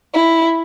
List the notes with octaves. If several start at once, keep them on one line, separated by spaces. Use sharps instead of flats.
E4